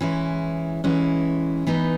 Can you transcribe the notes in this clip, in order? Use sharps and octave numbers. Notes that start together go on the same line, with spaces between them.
E3 G#3 C#4 E4
E3 G#3 C#4 E4
E3 B3 D#4